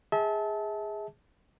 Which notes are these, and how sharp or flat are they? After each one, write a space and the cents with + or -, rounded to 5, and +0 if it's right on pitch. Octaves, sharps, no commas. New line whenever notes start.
G#4 -10 E5 -35 A5 -15